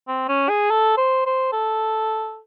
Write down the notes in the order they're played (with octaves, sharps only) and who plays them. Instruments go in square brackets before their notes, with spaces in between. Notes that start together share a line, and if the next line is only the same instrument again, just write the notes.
[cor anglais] C4
C#4
G#4
A4
C5
C5
A4